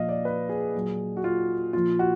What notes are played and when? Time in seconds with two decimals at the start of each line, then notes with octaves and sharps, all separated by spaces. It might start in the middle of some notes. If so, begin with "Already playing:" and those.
Already playing: A#2 F3 D#5 F5
0.09 D5
0.25 B4
0.49 G#4
0.75 A#2 F#3
1.17 F#4
1.24 F4
1.73 A#2 F3 F4
1.99 F#4